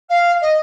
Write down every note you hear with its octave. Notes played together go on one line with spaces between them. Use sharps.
F5
D#5